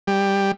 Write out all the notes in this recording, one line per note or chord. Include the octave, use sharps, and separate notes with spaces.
G3